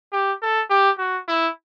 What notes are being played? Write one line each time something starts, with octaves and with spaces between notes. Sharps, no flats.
G4
A4
G4
F#4
E4